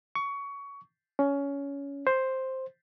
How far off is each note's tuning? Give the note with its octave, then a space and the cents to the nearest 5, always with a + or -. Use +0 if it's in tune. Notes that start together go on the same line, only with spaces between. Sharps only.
C#6 +20
C#4 +20
C5 +5